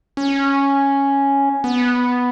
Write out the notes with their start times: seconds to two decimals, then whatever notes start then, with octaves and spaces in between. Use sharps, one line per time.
0.17 C#4
1.64 B3